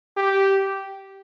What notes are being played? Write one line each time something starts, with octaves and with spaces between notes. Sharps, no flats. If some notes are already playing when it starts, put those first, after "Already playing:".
G4